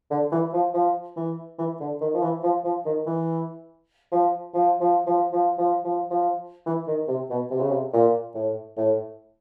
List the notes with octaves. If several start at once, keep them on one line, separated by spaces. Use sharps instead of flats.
D3
E3
F3
F3
E3
E3
D3
D#3
F3
E3
F3
F3
D#3
E3
F3
F3
F3
F3
F3
F3
F3
F3
E3
D#3
C3
B2
C3
C#3
C3
A#2
A2
A2